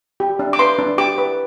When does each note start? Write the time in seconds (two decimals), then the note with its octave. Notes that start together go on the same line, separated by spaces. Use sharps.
0.20 G4
0.39 D4
0.53 D6
0.59 B4 C6
0.79 D4
0.98 G4 D6
1.18 B4